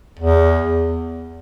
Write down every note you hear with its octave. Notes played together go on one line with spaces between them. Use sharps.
E2